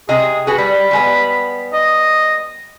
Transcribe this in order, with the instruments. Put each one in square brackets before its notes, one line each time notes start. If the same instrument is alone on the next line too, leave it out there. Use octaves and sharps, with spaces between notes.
[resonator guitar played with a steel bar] C3 D#5 A#5 [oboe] G#4
[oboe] F#4 [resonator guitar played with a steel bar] G#4 B4
[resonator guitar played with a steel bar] G3 [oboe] B5
[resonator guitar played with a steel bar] G3 G#3 B3
[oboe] D#5